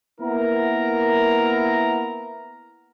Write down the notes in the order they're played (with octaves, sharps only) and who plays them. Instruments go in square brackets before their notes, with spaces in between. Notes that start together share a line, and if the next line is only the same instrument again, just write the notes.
[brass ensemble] A#3 B3 E4 A#4 A#5